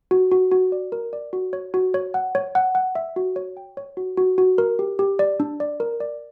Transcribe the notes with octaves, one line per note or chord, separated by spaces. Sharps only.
F#4
F#4
F#4
D5
A#4
D5
F#4
C#5
F#4
C#5
F#5
C#5
F#5
F#5
E5
F#4
C#5
G5
C#5
F#4
F#4
F#4
A#4
G4
G4
D5
D4
D5
A#4
D5